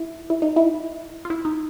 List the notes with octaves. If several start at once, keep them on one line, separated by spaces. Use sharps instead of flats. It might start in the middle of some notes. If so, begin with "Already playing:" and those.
Already playing: E4
E4
D#4
E4
F4
E4
D#4